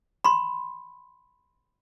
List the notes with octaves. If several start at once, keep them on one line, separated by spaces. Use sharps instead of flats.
B5 C6